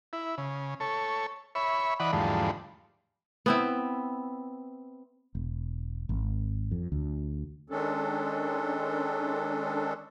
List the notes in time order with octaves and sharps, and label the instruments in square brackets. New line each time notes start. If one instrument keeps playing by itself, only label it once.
[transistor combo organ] E4
C#3
A4 C#5
C#5 E5 B5
E3 D5 D#5 F#5 B5
E2 G#2 D3 F3 G3 A3
[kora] B3 C4 E4
[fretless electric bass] E1
G#1
F2
D2
[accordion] D#3 G#3 C#4 D4 A4